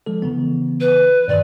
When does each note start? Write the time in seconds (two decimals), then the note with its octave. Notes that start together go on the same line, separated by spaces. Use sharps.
0.06 F3 G#3 A4
0.22 C#3 E3 B3
0.80 B4
1.28 G2 A#2 D#3 D5